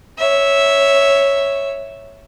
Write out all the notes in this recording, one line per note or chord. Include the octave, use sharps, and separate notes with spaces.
C#5 E5